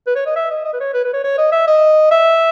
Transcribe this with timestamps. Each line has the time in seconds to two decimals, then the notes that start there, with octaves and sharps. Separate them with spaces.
0.07 B4
0.16 C#5
0.26 D#5
0.36 E5
0.50 D#5
0.65 D#5
0.74 B4
0.80 C#5
0.94 B4
1.05 B4
1.14 C#5
1.24 C#5
1.38 D#5
1.52 E5
1.68 D#5
2.11 E5